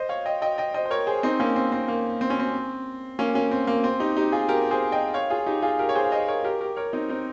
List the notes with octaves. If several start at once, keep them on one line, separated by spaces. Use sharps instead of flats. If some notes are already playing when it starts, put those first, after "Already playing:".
Already playing: C5 D#5
C#5 F5
D#5 G5
D#5 G5
D#5 G5
C5 D#5
C5
A#4 C#5
G#4 C5
C4 D#4
A#3 C#4
C4
C4
A#3
C4
C#4
C4
A#3 C#4
A#3 C#4
C4
A#3
C4
D#4 G4
D#4 G4
F4 G#4
G4 A#4
G#4 C5
D#5 G5
C#5 F5
F4 G#4
D#4 G4
F4 G#4
G4 A#4
C#5
G#4 C5
F5
C5 D#5
A#4 C#5
G4 A#4
G4 A#4
A#4 C#5
C4 D#4
C4 D#4